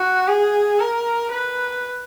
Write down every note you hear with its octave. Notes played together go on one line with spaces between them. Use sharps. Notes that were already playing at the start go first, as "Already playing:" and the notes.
Already playing: F#4
G#4
A#4
B4